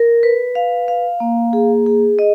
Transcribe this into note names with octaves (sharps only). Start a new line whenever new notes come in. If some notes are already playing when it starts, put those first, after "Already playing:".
Already playing: A#4
B4
F5
F5
A#3
G#4
G#4
D#5